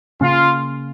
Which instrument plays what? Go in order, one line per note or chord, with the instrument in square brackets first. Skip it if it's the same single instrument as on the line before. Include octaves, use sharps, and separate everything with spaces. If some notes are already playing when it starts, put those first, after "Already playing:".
[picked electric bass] C#3 A#3 C#4 [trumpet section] F4